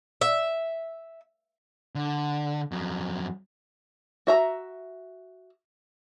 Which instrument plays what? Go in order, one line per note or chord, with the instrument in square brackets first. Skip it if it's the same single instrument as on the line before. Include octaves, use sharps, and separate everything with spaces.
[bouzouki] E5
[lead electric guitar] D3
F2 F#3
[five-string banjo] F#4 E5 A#5